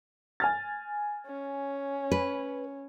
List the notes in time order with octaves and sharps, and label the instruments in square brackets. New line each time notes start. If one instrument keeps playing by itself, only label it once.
[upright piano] G#5 F6 A6
[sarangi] C#4
[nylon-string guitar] B4